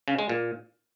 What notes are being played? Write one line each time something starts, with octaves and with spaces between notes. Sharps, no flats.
C#3
G#3
A#2